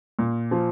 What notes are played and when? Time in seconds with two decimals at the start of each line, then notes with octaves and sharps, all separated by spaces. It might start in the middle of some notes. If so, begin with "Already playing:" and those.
0.19 A#2
0.51 F3